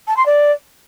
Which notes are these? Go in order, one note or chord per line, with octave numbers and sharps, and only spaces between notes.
A5
C6
D5